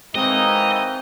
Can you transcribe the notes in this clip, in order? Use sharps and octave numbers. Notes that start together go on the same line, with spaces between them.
E3 G#3 A#3 C4 D#4 F#4 D#5